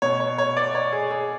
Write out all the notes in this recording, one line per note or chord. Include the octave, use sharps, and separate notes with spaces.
B2 C#5
C#5
C#5
D5
C#5
G#4
G#4